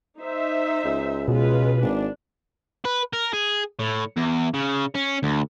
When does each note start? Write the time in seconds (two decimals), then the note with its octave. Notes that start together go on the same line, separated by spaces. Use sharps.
0.18 D#4 C5 E5
0.85 C#2
1.28 B2 G#3 F4 B4
1.82 G#1 D4
2.85 B4
3.13 A#4
3.33 G#4
3.79 A2
4.17 E2
4.54 C#3
4.95 C#4
5.23 D2